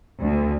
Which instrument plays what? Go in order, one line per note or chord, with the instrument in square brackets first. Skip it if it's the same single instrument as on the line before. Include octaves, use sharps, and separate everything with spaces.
[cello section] D2